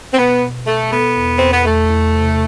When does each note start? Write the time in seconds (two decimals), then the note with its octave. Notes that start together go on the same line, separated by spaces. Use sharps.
0.13 C4
0.17 B2 B3
0.42 B2
0.66 B2 A3
0.91 B3 A4
1.16 E2
1.38 E2 C4
1.52 B3
1.65 E2 A3
1.90 E2
2.15 C3